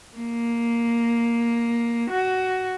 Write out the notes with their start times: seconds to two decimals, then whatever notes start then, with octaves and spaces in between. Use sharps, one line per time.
0.17 A#3
2.10 F#4